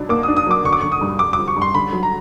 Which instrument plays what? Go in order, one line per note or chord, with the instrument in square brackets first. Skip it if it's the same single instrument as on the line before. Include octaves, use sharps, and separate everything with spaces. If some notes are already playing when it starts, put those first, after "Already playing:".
Already playing: [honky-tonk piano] B2 F#3 D4
[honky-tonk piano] A#3 [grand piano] D6
[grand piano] D#6
[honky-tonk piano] D4
[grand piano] D#6
[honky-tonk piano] F#3 [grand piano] D6
[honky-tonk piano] D3 [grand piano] C#6
[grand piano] D6
[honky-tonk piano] D3 [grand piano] C#6
[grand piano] D#6
[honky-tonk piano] G2
[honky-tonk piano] G2 [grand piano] D6
[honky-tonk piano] F3 [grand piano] D6
[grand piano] C#6
[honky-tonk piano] G2
[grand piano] C6
[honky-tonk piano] D3 [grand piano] B5
[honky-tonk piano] F#3
[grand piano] A#5